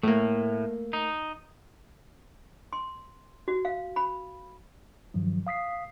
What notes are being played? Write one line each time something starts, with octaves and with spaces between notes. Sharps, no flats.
A2 A3 A#3
D#4
C6
F#4
F5
B5
G2 D#3 F3 F#3
F5 D#6 B6 C7